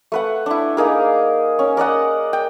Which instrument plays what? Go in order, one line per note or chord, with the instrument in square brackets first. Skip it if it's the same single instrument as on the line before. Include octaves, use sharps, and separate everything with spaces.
[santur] A3 B4 F#5
D4 E4
A#3 D#4 G#4 A#4
C#4
A#4 D5 D#5 F#5
G5